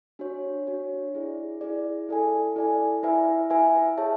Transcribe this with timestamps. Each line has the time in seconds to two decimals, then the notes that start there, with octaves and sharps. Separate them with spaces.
0.19 D4 F#4 C#5
0.67 D4 F#4 C#5
1.15 E4 G#4 D5
1.61 E4 G#4 D5
2.09 E4 A4 D5 G#5
2.56 E4 A4 D5 G#5
3.03 E4 B4 E5 G#5
3.50 E4 B4 E5 G#5
3.98 G#4 C#5 E5 A5